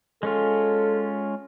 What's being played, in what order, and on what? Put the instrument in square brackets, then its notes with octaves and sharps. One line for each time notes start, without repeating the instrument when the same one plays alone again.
[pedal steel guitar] G#3 C#4 F4 [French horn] A4